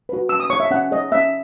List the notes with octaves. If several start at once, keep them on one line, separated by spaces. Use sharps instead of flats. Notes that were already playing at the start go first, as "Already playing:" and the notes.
F#4 B4
C#4 E6
D#6
G#4 C#5 C#6
E5
C#4 F#5
G#4 C#5 D#5
C#4 E5